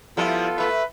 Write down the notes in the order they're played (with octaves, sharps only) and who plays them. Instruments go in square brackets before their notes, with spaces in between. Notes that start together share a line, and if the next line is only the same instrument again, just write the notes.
[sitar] F3 G3 E4 [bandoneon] B3 F4 A4
[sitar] A3 E5 [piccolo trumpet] B4